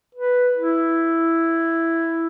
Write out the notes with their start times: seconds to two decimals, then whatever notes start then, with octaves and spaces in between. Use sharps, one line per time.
0.15 B4
0.57 E4